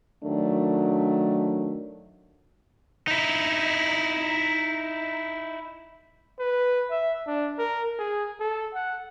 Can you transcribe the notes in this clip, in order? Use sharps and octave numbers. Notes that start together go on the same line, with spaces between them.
D#3 F#3 A3 D4
D#4 E4
B4
E5
D4
A#4
G#4
A4
F#5